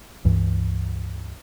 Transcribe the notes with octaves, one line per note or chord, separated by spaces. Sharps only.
C#2 G2 E3